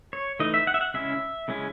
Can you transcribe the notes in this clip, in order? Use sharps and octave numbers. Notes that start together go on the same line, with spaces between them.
C#5
E3 A3 D#4 D#5
E5
F#5
E5
F#5
C#3 G#3 C#4 E4 E5
C#3 G#3 C#4 E4